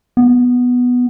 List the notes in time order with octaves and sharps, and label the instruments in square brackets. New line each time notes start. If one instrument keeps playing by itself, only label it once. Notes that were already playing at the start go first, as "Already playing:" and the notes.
[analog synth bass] B3